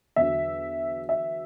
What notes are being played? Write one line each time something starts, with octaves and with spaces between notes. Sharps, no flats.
E2 D3 F#3 E5
E5